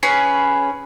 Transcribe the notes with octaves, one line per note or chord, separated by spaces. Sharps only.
C#4 G#4 B4